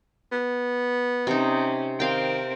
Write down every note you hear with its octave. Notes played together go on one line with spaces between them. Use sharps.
B3
C3 C#4 D#4
D#3 C4 A#4 F5 G5